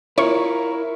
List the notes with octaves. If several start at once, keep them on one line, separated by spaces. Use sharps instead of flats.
E4 F4 A#4 C#5 C#6